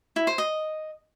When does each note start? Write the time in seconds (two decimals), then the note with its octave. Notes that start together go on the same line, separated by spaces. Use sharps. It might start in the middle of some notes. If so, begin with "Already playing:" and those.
0.16 E4
0.27 C5
0.38 D#5